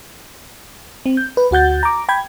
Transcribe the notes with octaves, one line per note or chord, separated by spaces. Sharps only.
C4
G6
B4
D2 F#4 F#5 G6 A6
A#5 D6
G5 B5 G#6